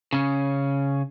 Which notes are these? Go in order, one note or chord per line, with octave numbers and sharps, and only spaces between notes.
C#3 C#4